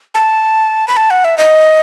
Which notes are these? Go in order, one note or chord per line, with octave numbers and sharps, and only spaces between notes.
A5
B5
A5
F#5
E5
D#5